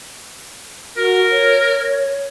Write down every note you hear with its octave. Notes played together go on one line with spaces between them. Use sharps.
F#4 A#4
C#5